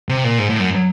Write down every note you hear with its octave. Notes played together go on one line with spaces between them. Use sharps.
C3
A#2
G#2
A2
F#2